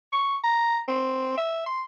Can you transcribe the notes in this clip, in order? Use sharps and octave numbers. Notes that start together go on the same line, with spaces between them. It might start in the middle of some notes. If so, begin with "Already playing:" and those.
C#6
A#5
C4
E5
C6